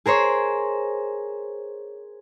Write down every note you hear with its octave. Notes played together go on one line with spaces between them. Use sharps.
G#4 A#4 C5 C#5